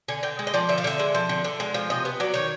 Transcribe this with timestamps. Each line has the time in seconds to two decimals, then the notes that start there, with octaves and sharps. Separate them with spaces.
0.08 D3 G#5
0.23 D3 G5
0.39 G#3
0.47 D#5
0.54 F3 D5
0.69 D3 E5
0.78 F5
0.84 D3 E5
0.99 G#3
1.14 F3
1.29 D3
1.44 D3
1.60 G#3
1.74 F3
1.90 C3 D#5
2.05 B3
2.20 F#3 D5
2.34 D#3 C#5